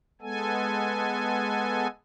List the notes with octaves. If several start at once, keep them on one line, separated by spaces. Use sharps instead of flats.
G#3 B3 A4 G#5